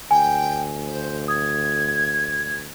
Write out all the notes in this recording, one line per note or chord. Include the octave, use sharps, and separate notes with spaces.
D2 G5 G#5
C5
D#6 G#6